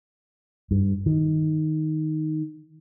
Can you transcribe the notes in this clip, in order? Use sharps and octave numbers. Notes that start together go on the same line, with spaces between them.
G2
D#3